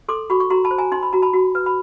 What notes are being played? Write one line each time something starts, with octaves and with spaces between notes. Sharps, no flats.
A4 C6 D6
F#4 B5 C#6
C#6
F#4 A#5 C6
A5 B5
C5
G#5 A#5
D#4 C6
B5
F#4 A#5
A5 B5
F#4
B4
B5